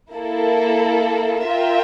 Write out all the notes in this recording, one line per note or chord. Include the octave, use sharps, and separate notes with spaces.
A#3 E4 A4
F4 A#4 E5 G5